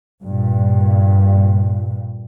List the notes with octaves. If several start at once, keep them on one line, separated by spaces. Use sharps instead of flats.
G2 A#2